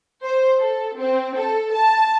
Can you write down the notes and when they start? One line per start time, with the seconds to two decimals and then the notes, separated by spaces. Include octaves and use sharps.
0.23 C5
0.59 A4
0.97 C4
1.36 A4
1.73 A5